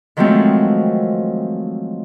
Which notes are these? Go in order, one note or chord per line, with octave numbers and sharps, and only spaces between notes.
D#3 F3 F#3 G#3 A3 C4